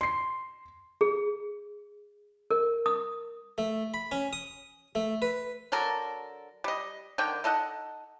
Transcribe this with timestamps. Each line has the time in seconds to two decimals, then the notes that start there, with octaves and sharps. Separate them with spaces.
0.01 C6 C7
1.01 G#4
2.51 A#4
2.86 D#6
3.58 A3
3.94 B5
4.12 C#4
4.33 D#6
4.95 A3
5.22 B4
5.72 D3 F#3 A4 A#4
6.64 G3 D#5
7.18 D3 D#3 G5
7.44 D#4 A4 D#5 F#5